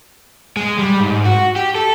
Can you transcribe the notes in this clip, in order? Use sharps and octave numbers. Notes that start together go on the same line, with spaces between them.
G#3
G3
G#2
F#4
G4
A4